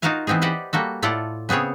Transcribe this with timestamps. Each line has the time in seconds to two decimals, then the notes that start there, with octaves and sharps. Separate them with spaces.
0.02 D#4 F4 F#4 A#4 F5 G#5
0.27 E3 B3 C4 D#4 G#4
0.42 G4 B4 C5 D5 D#5 F#5
0.73 G3 A#3 F#4 A4
1.02 A2 E4 F4 A4 D5 F#5
1.49 C#3 B3 C4 G#4 C#5